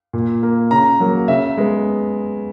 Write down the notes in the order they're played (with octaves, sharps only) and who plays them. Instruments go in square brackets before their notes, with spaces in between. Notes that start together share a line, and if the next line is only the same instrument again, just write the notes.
[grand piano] A#2
A#3
C#3 A#5
F#3 A#3
C#3 E5
G#3 B3